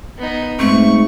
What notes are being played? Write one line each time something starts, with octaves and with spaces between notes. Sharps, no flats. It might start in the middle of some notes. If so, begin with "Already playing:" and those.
B3 D#4
G#2 A3 C4 C#6